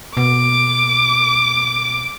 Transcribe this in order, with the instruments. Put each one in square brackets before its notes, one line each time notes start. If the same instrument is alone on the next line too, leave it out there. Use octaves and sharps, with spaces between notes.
[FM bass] B2 [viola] D6